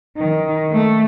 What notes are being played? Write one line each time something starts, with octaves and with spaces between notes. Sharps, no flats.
D#3
A3